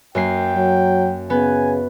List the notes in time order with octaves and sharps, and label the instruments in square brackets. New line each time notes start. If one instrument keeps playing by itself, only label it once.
[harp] F#2 A#3 C7 [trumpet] G5
[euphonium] F#3
[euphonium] C#3 [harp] B3 [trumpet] G#5